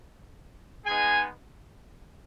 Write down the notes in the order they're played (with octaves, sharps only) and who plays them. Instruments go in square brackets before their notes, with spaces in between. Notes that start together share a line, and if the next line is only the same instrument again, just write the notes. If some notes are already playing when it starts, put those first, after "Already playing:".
[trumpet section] G#3 B3 D#4 G#4 G#5